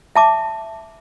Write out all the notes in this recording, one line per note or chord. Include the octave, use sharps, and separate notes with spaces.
E5 A5 D6